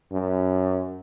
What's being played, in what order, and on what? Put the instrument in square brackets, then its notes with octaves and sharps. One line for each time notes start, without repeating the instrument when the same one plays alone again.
[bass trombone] F#2